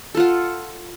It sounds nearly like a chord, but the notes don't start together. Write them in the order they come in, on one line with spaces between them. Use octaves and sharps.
A4 F4 F#5